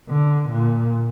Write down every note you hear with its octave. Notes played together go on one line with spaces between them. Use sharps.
D3
A#2